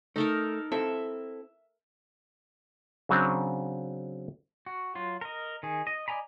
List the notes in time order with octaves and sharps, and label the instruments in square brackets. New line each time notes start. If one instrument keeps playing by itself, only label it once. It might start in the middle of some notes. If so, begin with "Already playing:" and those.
[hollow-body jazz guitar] A3 [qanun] D#4 A4 A#4
[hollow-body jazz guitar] C4 E4 A4 [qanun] E5
[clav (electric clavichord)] C#3 F#3 C4 D4
[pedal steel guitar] F#4
F#3 F4
A#4 D#5
D#3 G#4
D#5
D5 D#5 G#5 A#5 B5